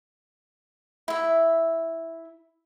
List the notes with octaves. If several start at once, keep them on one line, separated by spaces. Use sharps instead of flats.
E4 E5